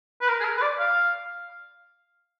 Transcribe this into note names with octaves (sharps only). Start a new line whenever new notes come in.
B4
A#4
G#4
A#4
B4
D5
F5